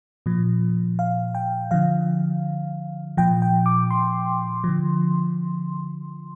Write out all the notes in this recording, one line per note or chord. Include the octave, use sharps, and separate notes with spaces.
A#2 F3
F5
G5
D3 F3 F5
A#2 F3 G5
G5
D6
C6
D3 F3